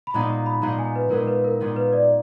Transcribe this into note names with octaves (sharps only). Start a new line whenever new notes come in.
B5
A#2 G#3 B3 D#4 A#5
A#5
B5
A#2 G#3 B3 D#4 A#5
G#5
B4
A#2 G#3 B3 D#4 A#4
B4
A#4
A#2 G#3 B3 D#4
B4
D5